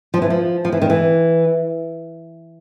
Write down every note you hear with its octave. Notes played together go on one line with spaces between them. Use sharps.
F3
E3
F3
F3
E3
D#3
E3